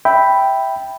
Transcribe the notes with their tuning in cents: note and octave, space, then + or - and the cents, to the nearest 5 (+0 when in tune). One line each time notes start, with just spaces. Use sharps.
E5 -5 G5 +0 B5 +0